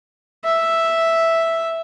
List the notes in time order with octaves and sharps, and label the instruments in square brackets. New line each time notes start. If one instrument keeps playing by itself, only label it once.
[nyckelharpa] E5